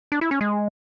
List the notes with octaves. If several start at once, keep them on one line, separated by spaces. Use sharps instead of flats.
D4
E4
C#4
G#3